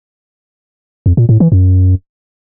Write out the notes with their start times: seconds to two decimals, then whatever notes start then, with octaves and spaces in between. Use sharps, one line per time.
1.06 F2
1.17 A#2
1.29 A2
1.40 E3
1.52 F#2